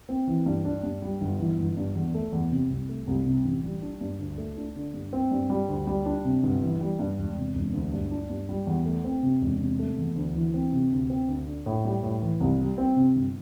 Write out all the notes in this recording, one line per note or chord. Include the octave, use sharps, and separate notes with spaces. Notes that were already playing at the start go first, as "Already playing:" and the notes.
C4
E3
G2
D4
G2
G3
G1
E3
G1
G2
E2
A3
E2
C3
C2
A3
C2
C3
A1
G3
D4
G2
D2
A3
D4
D3
G2
C4
G2
G3
D2
G3
D4
C3
G1
E3
G3
G2
E1
C3
E1
D2
G2
D4
G2
G3
E2
A3
C4
C3
E1
C3
A3
E2
D2
E3
C4
C3
D2
C4
D2
D3
A2
G3
A2
E3
C2
G3
C4
C3
G1